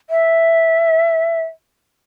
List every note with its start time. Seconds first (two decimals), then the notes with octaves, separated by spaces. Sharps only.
0.10 E5